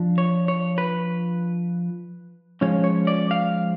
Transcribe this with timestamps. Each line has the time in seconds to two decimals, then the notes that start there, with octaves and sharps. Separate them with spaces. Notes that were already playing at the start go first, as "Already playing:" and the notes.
Already playing: F3 D4 F4
0.18 C#5
0.48 C#5
0.78 B4
2.61 F3 G#3 C#4 F4 C#5
2.84 C#5
3.07 D5
3.31 F5